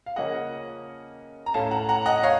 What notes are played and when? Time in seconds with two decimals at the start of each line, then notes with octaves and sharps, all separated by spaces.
0.06 F5
0.16 C#3 F3 A#3 C#4 D#5 F#5
1.46 A#5
1.54 A2 A3 C#4 F5 A5
1.71 F#5 A#5
1.89 F#5 A#5
2.06 D#5 F#5
2.23 C#5 F5